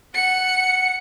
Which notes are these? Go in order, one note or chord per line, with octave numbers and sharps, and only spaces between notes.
F#5 C#7